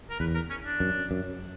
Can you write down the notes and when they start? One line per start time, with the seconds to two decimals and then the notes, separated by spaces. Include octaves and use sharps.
0.10 A#4
0.20 E2 B4
0.35 A#4
0.50 C#4
0.65 D4
0.80 F#2
1.11 F#2